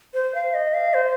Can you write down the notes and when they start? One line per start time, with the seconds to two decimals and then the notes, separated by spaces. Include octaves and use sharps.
0.14 C5
0.35 F5
0.54 D#5
0.74 F5
0.94 C5